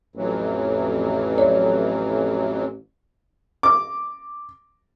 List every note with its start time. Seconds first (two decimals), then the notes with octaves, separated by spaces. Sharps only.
0.16 A1 F2 E3 F#3
1.38 C#5 D5
3.63 D6